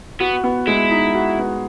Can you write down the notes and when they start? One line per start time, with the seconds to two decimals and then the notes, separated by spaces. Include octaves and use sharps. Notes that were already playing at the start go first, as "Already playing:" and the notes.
0.20 B3 F#4
0.44 B3
0.67 G#3 E4
0.90 D#4
1.14 F#4
1.39 B3